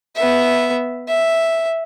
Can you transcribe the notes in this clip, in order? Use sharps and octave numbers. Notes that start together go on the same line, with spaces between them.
B3 E5
E5